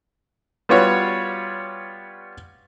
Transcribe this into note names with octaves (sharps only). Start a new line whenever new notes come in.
G3 B3 F4 F#4 C#5